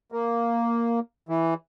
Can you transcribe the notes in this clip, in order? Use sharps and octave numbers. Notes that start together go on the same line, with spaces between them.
A#3
E3